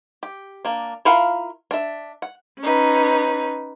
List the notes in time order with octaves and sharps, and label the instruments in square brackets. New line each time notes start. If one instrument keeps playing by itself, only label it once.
[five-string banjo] G4
A#3 D4
E4 F4 A#4 F5 F#5
D4 E5
F#5
[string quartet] C#4 D#4 B4